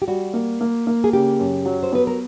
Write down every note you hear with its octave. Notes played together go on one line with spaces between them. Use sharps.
G4
G3 F#4
A#3
A#3
A#3
G#4
C#3 G4
F#2
F#3
C5
B3 B4
A#4